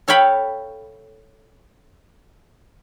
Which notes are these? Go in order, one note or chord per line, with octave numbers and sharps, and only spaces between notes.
A4 C#5 F5 G5 B5